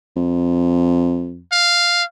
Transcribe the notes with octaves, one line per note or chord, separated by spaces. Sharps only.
F2
F5